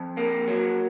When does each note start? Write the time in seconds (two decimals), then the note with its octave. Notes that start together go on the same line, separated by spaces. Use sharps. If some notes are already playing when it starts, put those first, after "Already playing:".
Already playing: F2
0.17 A#3
0.48 F#3